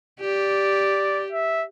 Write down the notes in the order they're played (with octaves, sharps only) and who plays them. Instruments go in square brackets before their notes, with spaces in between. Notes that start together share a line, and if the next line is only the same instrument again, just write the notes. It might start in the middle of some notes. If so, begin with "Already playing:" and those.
[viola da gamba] G4 [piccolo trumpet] D5
[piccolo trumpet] E5